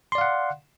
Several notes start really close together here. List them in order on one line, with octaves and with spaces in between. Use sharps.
C6 D5 F5 F#5